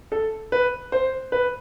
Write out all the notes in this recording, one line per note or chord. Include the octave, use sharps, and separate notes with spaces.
A4
B4
C5
B4